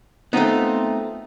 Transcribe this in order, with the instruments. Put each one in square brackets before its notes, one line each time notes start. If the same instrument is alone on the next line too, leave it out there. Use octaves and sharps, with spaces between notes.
[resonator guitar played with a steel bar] A3 D#4 [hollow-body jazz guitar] B3 C4 F4